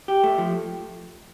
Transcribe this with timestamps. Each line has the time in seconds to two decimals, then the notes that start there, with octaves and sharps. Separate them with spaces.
0.08 G4
0.24 A3
0.38 F3